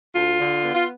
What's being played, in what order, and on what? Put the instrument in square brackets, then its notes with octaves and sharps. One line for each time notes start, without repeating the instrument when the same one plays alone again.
[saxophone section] D2 F4
D3
B3
F4